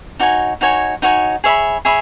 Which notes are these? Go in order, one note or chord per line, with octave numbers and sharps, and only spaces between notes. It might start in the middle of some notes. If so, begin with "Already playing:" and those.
D#4 F#4 C#5 G#5
D#4 F#4 C#5 G#5
D#4 F#4 C#5 G#5
G#4 C#5 E5 B5
G#4 C#5 E5 B5